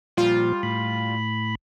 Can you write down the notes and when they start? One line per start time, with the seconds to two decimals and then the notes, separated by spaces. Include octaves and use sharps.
0.17 A#2 F3 G3 F4
0.63 A2 B5